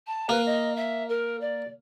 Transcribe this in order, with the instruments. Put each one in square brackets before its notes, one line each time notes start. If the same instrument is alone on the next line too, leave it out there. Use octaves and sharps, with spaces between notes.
[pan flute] A5
[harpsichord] A#3 [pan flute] B4
[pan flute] D#5
E5
A#4
D5